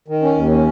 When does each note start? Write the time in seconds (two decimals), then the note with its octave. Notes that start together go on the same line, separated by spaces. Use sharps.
0.08 D#3
0.23 C#4
0.36 D#2
0.51 C#4